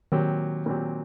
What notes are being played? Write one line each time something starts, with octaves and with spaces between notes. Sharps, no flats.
A#2 D#3 F#3 C4 G4
A#2 F#3 C4 G4